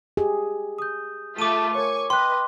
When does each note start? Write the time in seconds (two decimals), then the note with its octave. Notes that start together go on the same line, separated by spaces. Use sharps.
0.17 G4 G#4
0.78 D#6 G6
1.39 A3 F4 A4 D6 D#7
1.75 A#4 C#5 G#5 C#6
2.10 B4 D#5 G5 C6 F#6